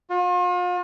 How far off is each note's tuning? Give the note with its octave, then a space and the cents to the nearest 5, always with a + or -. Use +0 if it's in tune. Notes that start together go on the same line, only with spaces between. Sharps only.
F4 +40